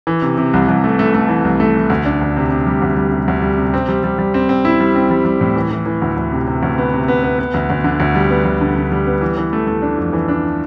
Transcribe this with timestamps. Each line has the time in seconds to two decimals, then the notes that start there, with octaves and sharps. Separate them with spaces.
0.07 E3
0.22 C3
0.38 C3
0.53 C2
0.68 C2
0.84 A3
0.99 A3
1.14 A3
1.29 E3
1.44 C2
1.60 A3
1.75 E3
1.90 D2
2.05 D4
2.21 D2
2.36 C3
2.51 C3
2.67 G3
2.82 D2
2.97 G3
3.12 C3
3.28 D2
3.42 G3
3.58 C3
3.74 C4
3.89 G3
4.04 G3
4.18 G3
4.34 C4
4.49 C4
4.65 E4
4.80 G3
4.96 C4
5.11 G3
5.25 G3
5.41 A2
5.56 E3
5.71 E3
5.86 E3
6.02 D2
6.17 D2
6.32 C3
6.47 C3
6.63 D2
6.78 B3
6.93 C3
7.08 B3
7.23 B3
7.39 B3
7.54 D2
7.70 D2
7.84 D3
8.00 D2
8.15 G3
8.30 B3
8.45 D2
8.61 D3
8.75 D3
8.92 G3
9.07 B3
9.21 E3
9.37 E3
9.53 A3
9.67 A3
9.82 D4
9.97 F2
10.13 E3
10.28 D4